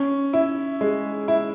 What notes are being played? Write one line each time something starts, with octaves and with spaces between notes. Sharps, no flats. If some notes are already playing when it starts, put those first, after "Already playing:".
Already playing: C#4
E4
G#3
E4